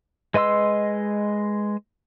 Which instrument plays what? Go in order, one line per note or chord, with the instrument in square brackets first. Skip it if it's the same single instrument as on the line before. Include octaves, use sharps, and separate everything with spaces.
[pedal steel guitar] G#3 B4 D#5 C6 E6